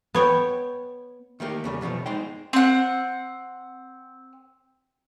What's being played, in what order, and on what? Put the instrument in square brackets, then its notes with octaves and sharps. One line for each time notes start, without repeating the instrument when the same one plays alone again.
[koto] B3 C#5 G5
[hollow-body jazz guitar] D#3 A3 A#3 G4
E2 C#3 G3
F#2 B2 D#3 F3 A3
G#3 D#4 G#4 C5 G5
[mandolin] C4 F#5